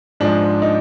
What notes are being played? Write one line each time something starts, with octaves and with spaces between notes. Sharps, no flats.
G#2 F3 G#3 D4
D#4